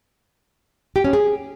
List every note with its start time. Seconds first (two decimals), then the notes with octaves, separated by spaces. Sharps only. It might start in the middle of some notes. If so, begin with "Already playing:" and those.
0.96 G4
1.04 C#4
1.13 G#4